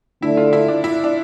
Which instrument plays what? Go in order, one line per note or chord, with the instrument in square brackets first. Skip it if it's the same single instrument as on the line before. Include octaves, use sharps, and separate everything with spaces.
[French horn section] D3 A3 D4 [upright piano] E4
[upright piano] F4
E4
D4
E4
D4